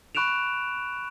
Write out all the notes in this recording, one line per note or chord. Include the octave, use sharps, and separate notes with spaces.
B5 C#6 F#6 D7 E7 F7